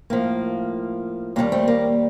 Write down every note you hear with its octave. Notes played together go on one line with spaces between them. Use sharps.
A2 F3 A#3
D#2 D#3 G3 A#3
A3 C4
A#3